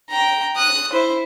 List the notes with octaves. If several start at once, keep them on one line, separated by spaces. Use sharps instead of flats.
G5 A#5
D#6 F#6
E4 C5